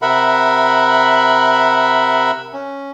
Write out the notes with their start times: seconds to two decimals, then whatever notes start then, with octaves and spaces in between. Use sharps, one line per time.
0.02 C3 A#4 E5 F#5 B5
2.53 C#4